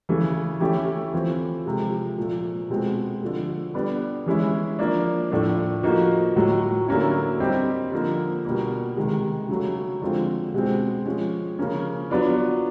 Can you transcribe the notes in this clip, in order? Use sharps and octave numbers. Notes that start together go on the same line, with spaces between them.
C#3 E3 A3
E3 A3 C#4 E4 G4
E3 A3 C4 F4
C3 F3 G#3
A#2 F3 A3
B2 G#3 C4
D3 F3 A3
G3 B3 D4
E3 G#3 C#4 E4
F3 A#3 D4
A2 F3 A3 D4
F3 A#3 D#4 F#4
A2 F#3 A3
D3 F#3 A#3 C#4 E4
G3 C4 D#4 G4
D3 F3 A#3
B2 G3 A#3
C3 D#3 G#3
C#3 F#3 A3
D3 F3 G#3 C4 F4
B2 G#3 C4
F3 G#3 C#4
C#3 F3 A#3 C#4
F#3 B3 D4 F4